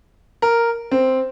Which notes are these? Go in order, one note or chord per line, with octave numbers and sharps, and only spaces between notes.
A#4
C4